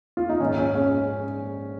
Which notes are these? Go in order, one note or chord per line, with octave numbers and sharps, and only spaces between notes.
F4
D#4
A#1 G#2 D#3 C#4
C#4
C#4